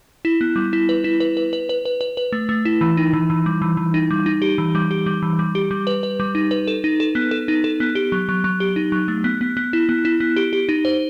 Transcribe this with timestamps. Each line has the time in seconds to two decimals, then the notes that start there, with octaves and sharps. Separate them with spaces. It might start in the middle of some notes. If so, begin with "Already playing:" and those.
0.25 E4
0.41 B3
0.56 G3
0.73 E4
0.89 B4
1.04 E4
1.20 B4
1.37 B4
1.53 B4
1.69 B4
1.85 B4
2.01 B4
2.17 B4
2.32 A3
2.49 A3
2.65 E4
2.81 E3
2.97 D#4
3.13 E3
3.30 E3
3.46 G3
3.62 E3
3.77 E3
3.94 D#4
4.11 G3
4.26 D#4
4.42 G4
4.58 E3
4.75 G3
4.91 G4
5.06 G3
5.22 E3
5.39 G3
5.55 G4
5.71 G3
5.87 B4
6.03 B4
6.20 G3
6.35 D#4
6.51 B4
6.67 A4
6.84 D#4
7.00 A4
7.15 B3
7.31 A4
7.48 D#4
7.64 A4
7.80 B3
7.95 G4
8.12 F#3
8.29 F#3
8.44 F#3
8.60 G4
8.76 D#4
8.92 F#3
9.08 A3
9.24 B3
9.41 B3
9.57 B3
9.73 E4
9.89 B3
10.05 E4
10.20 B3
10.36 G4
10.53 G4
10.69 D#4
10.85 C5